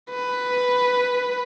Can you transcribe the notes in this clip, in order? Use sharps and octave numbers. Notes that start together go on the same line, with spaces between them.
B4